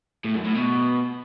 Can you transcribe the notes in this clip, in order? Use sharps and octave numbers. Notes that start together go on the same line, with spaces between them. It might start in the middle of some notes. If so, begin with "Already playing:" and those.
A2
F#2
A2
B2